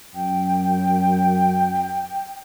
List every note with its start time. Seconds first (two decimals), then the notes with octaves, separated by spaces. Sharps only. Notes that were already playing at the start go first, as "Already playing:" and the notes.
0.15 F#2 G5